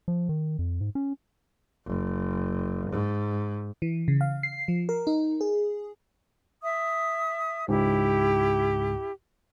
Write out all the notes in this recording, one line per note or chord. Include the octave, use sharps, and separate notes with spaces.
F3
D#3
F2
G#2
C#4
F#1
G#2
E3
C#3
F5
C7
F3
A#4
D#4
G#4
E5 D#6
C#2 G#2 E4 G4